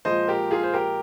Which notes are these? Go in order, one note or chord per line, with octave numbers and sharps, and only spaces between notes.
A#2 F3 G#3 C5 D#5
G4 A#4
F4 G#4
C5
G4 A#4